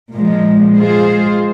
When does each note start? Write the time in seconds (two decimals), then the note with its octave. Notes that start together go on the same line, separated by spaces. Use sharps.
0.12 A#2 F3 G#3
0.77 G#3 F4 G#4 C5